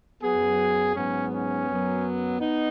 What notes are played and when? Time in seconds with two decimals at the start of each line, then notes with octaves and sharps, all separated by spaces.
0.23 F#2 F#3 B3 G#4
0.96 G#2 F#3 B3 C#4
1.32 C#4
1.69 F#2 F#3 B3
2.40 B3 D#4